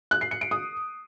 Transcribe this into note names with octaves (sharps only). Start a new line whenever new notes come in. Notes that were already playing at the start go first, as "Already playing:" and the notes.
F#6
C7
C#7
D7
D#6